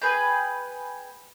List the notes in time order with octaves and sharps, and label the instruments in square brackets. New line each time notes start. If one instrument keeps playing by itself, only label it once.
[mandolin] G#4 B4 G5